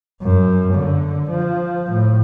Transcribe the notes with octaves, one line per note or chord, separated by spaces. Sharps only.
F#2
D3
F3
A2